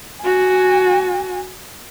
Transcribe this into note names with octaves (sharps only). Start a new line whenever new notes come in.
F#4 G#5